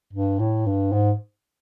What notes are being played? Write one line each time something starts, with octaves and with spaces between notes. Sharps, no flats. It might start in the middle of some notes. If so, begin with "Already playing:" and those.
G2
A2
G2
G#2